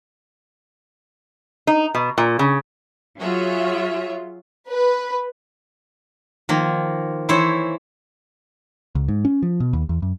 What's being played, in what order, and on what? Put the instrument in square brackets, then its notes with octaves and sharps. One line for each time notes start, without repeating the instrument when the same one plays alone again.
[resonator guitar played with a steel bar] D#4
B2
A#2
C#3
[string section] F#3 F4 F#4 G#4 C#5 E5
B4
[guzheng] D#3 F3 A#3
E3 E4 C5 C#5
[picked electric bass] C#2
G#2
C#4
F3
B2
D#2
E2
F#2